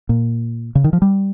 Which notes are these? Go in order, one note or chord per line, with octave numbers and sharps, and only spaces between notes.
A#2
C#3
D#3
F3
G3